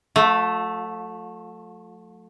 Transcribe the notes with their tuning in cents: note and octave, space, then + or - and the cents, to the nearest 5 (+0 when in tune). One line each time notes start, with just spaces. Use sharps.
F3 +45 A3 +0